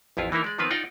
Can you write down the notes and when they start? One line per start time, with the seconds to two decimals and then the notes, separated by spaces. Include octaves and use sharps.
0.17 A1 F2 E4 F4
0.32 E3 A#3 D#4 E4 A#4
0.44 G#3 D5
0.58 D#3 F3 B3 C4 F4 B4
0.71 D#4 F4 D5 F#5 G5